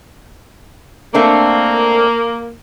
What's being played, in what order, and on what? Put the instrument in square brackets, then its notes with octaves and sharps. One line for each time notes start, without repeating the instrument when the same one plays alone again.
[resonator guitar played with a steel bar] A3 C4 D4 [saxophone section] A#3